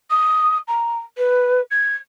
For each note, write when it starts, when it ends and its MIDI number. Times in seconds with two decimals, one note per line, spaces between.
0.11 0.58 87
0.68 1.01 82
1.17 1.61 71
1.71 1.95 92